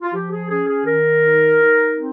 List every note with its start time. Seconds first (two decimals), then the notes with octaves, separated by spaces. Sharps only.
0.02 F4
0.14 F3 G4
0.32 G#4
0.49 C#4 G#4
0.68 G#4
0.86 D#3 A#4
1.23 D#4
1.60 D#4
1.96 C4